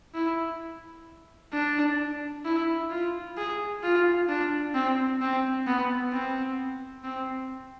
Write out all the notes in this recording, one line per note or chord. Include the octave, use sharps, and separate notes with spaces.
E4
D4
E4
F4
G#4
F4
D4
C4
C4
B3
C4
C4